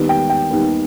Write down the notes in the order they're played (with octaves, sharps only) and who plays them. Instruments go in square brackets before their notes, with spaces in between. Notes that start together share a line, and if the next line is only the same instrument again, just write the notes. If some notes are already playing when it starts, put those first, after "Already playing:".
Already playing: [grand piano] D#2 D#3 G3 B3
G5
G5
D#2 D#3 G3 B3